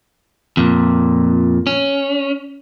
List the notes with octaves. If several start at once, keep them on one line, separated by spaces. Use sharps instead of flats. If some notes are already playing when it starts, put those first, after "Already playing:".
F2 A#2
C#4